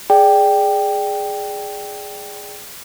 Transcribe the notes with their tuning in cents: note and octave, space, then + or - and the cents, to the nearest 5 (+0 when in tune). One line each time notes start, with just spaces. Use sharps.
G#4 +0 D5 +0 G5 +0